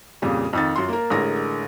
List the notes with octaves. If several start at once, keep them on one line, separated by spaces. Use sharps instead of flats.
F2 A#2 C#3 G3
F2 D#3 A6
F#2 F4 C6
A#3 A#4
A1 D3 G#3 A#4 A#6